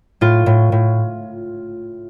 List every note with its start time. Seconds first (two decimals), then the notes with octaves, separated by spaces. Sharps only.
0.21 A2 F4
0.46 A2
0.72 A2